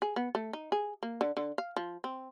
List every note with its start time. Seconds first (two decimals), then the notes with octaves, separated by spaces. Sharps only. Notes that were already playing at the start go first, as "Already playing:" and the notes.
0.02 G#4
0.16 B3
0.35 A3
0.53 D#4
0.72 G#4
1.03 A#3
1.21 D3
1.37 D3
1.58 F5
1.76 F3
2.04 C4